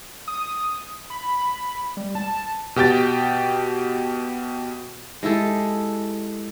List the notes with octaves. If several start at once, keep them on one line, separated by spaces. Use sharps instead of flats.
D#6
B5
G3
A5
B2 G4 G5 A6
G#3 E4 G4 A4